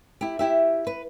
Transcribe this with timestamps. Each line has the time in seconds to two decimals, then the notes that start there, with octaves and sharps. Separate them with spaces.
0.21 E4 G4
0.39 E4 G4 E5
0.87 B4